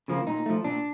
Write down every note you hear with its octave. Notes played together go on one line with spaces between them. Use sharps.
C#3 F3 A#3
A#2 D#4
F3 A3
A#2 D4